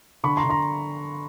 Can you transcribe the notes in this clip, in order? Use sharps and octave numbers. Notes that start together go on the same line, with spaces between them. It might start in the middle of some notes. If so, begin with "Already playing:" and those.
D3 B5 C#6
A#5 C6
D3
A#5 C6